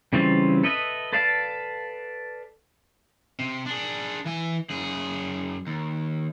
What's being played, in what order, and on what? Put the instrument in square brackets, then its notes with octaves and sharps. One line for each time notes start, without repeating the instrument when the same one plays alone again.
[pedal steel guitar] C#3 E3 G3 C4 F4
A4 B4 D#5 E5
A4 B4 D5 F5 A5
[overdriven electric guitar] C3
D4 G#4
E3 G#5
F#2 G#4
D#2